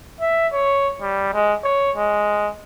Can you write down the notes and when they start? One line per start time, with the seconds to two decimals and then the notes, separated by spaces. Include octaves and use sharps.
0.20 E5
0.53 C#5
1.01 G3
1.34 G#3
1.64 C#5
1.96 G#3